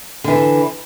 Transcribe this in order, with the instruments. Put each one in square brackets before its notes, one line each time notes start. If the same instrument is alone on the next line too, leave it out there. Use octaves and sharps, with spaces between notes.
[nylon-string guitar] D3 E3